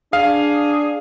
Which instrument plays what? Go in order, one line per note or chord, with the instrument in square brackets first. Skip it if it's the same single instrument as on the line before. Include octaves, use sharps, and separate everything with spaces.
[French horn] D4 [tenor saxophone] G#4 [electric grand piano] F5